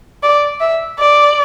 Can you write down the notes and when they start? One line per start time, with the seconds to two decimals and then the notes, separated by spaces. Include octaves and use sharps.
0.23 D5
0.60 E5
0.99 D5